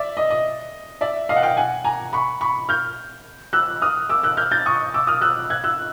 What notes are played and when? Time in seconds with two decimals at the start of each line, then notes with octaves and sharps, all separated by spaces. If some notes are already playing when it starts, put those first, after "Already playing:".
Already playing: D5 E5
0.17 D#5
0.30 D#5
1.01 D5 E5
1.29 D#5 F5
1.36 F#5
1.42 F5 G5
1.57 F#5 G#5
1.84 G#5 A#5
2.13 B5 C#6
2.41 B5 C#6
2.69 F6 G6
3.53 E6 F#6
3.82 D#6 F6
4.09 D6 E6
4.23 E6 F#6
4.37 F6 G6
4.51 G6 A6
4.66 C#6 D#6
4.94 D6 E6
5.07 D#6 F6
5.21 E6 F#6
5.50 F#6 G#6
5.64 E6 F#6